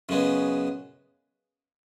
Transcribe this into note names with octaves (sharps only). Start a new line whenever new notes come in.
F#2 C#3 G#3 B3